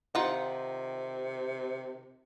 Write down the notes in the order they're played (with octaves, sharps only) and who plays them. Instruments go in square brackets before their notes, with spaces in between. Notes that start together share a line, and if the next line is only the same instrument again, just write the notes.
[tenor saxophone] C3 [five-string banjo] D#3 F4 F#5